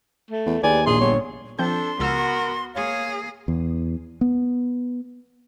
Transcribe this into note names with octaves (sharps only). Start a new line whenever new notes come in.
A3
E2
D#2 G4 G#4 B4 D5 G#5
A#1 G#4 C6
G1 C#5
F3 C4 D4 A4 C6 G6
C#2 B3 F#4 A#4 E6 F6
A#3 G#4 C#5 F5
E2
B3